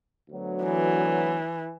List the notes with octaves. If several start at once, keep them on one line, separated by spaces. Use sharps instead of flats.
D2 D3 F#3 B3
E3